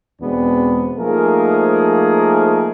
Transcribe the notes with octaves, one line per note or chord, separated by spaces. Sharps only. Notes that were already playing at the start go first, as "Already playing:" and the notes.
E2 B2 G#3 B3 C4 D4
F3 A3 A#3 D#4 G#4 A#4